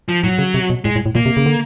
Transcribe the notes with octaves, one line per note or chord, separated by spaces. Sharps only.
F3
A2 F#3
C#3
C3
B2
A2 G#3
A2
A2
A#2 A#3
C3
C#3
D3